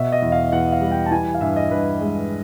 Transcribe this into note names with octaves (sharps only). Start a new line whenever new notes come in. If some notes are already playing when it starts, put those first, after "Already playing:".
Already playing: B2 E5
D#5
E2
F5
E2 F#5
F5
G3
G5
A5
E3 G#5
F5
G2 E5
D#5
G2 B4
G#3